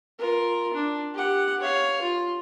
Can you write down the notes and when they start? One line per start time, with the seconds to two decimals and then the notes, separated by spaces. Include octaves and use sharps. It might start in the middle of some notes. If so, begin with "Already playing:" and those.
0.18 F4 A#4
0.73 D4
1.13 G4 F#5
1.60 C#5 F5
2.02 F4